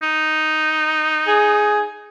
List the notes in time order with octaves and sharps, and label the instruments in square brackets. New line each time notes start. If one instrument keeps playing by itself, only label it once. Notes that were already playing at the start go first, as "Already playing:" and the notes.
[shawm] D#4
[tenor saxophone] G#4